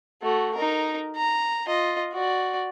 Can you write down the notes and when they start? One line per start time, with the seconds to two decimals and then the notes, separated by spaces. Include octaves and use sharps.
0.22 A3 F#4
0.55 D#4 A#4
1.16 A#5
1.67 F4 D#5
2.13 F#4 D5